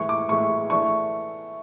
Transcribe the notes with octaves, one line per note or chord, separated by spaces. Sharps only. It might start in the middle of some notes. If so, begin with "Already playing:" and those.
Already playing: A2 E3 G#3 C#6
D6
A2 E3 G#3 C#6
E3 A3 D4 C#6